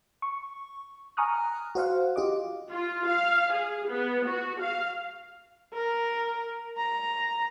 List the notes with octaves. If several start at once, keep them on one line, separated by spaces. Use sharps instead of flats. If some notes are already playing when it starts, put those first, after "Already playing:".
C#6
G#5 A#5 C#6 D#6 F6 F#6
F#4 C5 F5 F#5
F4 G4 D#5 D6
F4
F5
G#4
B3
F#4
F5
A#4
A#5